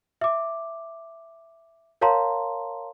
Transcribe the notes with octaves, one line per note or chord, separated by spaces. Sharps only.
E5 D6
A#4 C#5 F5 A5 A#5 C6